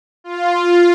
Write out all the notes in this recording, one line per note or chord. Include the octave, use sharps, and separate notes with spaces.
F4